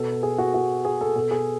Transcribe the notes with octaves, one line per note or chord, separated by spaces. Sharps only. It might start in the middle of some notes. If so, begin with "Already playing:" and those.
Already playing: B2 A4
A4
G#4
F#4
F#4
G#4
A4
B2 A4
G#4